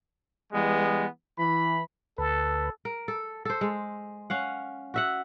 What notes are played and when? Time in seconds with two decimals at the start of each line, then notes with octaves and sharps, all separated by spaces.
0.53 E3 G3 G#3 B3
1.39 E3 B5
2.18 D2 A4 B4
2.85 A#4
3.08 A4
3.45 A4 C5
3.61 G#3
4.30 C#4 F5 F#5
4.94 F#4 E5 F#5